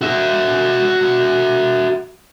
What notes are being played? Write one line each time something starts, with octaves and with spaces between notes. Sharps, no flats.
F#4 E5